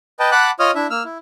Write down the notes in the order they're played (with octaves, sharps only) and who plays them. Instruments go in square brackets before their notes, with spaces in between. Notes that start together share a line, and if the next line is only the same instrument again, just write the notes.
[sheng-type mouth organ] B4 D#5 G5 A5
F#5 A5 B5 D6 F#6
F4 C#5 D#5 D#6 F6
D4 E4 E5
A#3 E6 F6
E4